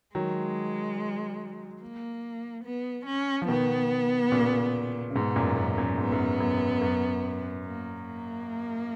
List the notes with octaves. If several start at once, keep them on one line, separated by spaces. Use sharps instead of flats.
D#3 F#3 G#3
A#3
B3
C#4
F3
B2 D#3 B3
A#2 C#3
C#3
G#2 B2 B3
F#2 A#2
F#2
F#2
G#2 B3
F#2
F#2
F#2
A#3
A#3